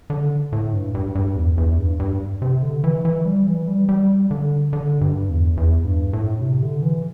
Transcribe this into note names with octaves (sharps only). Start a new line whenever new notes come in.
D3
A2
G2
G2
G2
E2
E2
G2
G2
C3
D3
E3
E3
G3
E3
G3
G3
D3
D3
G2
E2
E2
G2
A2
C3
D3
E3